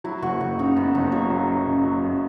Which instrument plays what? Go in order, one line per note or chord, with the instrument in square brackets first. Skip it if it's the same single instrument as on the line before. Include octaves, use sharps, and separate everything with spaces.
[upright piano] F#3 [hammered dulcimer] E4
[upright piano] F#1 [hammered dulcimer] F#4
[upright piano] F#1 [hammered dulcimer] F#4
[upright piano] C#3 [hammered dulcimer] D#4
[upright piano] F#2 [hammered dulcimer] B3
[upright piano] F#1 [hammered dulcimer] D#4
[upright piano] F#3 [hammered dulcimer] A#3
[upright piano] F#3
F#3
C#3
F#3
F#2